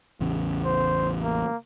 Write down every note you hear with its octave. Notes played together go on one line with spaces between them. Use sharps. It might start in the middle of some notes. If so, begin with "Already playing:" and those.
A1 E2 C#3
C5
A#3